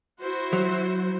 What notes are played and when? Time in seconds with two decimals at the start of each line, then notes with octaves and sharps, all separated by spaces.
0.21 E4 F#4 C5
0.53 F#3